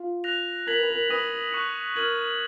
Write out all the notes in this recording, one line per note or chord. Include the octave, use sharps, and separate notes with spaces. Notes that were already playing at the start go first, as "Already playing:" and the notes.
Already playing: F4
F#6 A#6 F7
A#4 G#6 B6 F#7
B4
A#4
B4 D#6 A#6 D#7 F#7
C#6 F#6 C#7
A#4 F6 G#6 D#7 F#7